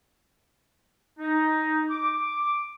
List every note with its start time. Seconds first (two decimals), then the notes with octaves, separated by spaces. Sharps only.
1.18 D#4
1.89 D6